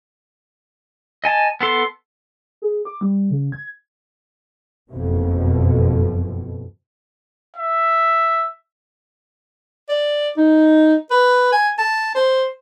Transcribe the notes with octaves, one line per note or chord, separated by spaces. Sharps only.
D#5 G#5 A5
B3 A4 C6
G#4
D6
G3
C#3
G#6
F#1 F2 B2
E5
D5
D#4
B4
G#5
A5
C5